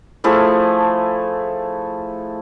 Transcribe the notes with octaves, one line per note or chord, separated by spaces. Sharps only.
F3 A3 E4 G#4